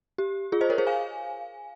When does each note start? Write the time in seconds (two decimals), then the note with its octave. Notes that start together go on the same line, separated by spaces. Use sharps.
0.18 G4
0.52 F4 G#4
0.61 C5 D#5
0.70 A#4 C#5
0.78 G#4 C5
0.87 F5 G#5